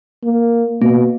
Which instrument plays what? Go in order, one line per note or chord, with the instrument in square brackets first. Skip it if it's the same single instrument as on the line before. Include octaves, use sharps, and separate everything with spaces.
[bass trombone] A#3
[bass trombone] B2 [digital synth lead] A#3